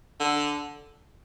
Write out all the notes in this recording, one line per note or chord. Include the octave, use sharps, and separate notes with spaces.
D3